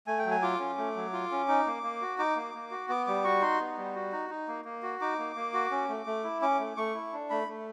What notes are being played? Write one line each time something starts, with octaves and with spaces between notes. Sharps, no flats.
A3 G#5
G5
F#3
G#5
F4 D6
C#4
A3
F#3
F4
C#4
D#4
A#3
A#3
F#4
D#4 D6
A#3
A#3
F#4
B3 D6
G3 D6
F#4 C#6
D#4 C6
B3
G3
F#4
D#4
D#4
A#3
A#3
F#4
D#4 D6
A#3
A#3
F#4
C#4
A3
A3
E4
C#4 D6
A3
A3 C#6
E4
D4
A3 B5
A3